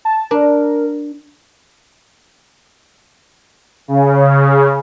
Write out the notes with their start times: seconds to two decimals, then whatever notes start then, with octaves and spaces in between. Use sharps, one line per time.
0.05 A5
0.31 D4 A#4
3.88 C#3